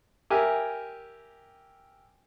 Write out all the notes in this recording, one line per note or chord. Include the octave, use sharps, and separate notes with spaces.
G4 A#4 E5 G#5